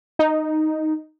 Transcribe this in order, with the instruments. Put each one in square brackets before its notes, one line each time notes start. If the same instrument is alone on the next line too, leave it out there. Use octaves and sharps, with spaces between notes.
[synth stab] D#4